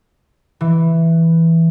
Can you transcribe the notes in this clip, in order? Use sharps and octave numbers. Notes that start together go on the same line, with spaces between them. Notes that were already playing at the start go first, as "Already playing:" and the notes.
E3